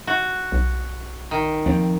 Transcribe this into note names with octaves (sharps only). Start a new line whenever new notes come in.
F#4
B1
D#3
D#2 F3 C4